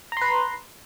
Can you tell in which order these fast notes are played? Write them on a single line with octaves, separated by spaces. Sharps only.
A#5 C6 B4